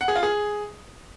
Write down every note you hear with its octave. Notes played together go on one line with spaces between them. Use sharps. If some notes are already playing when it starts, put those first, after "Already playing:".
F#5
G#4
F4
G#4